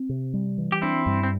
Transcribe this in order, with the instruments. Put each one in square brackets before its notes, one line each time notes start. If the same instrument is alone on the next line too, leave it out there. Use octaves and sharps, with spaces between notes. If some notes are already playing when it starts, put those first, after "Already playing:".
Already playing: [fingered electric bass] C4
C3
G3
E3
[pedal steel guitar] G4
[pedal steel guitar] C4 E4 [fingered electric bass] D4
[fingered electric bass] G2
[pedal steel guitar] C4